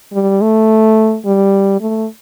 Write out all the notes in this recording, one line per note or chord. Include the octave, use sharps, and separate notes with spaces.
G3
A3
G3
A3